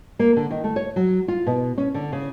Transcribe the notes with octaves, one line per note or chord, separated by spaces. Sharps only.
A#3
D3
D#3
A3
C#5
F#3
F4
B2
C#4
D3
C#3